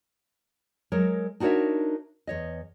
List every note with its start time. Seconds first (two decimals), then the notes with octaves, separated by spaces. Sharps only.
0.92 F#3 G#3 A#4 C#5
1.40 D4 D#4 F#4 A#4 C#5 E5
2.27 E2 C#5 D#5